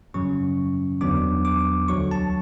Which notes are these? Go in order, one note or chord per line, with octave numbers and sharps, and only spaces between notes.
F#2 C#3 F#3 C#4 C#6
E2 D3 F#3 B3 D4 D6
D6
D2 D3 F#3 C#6
A5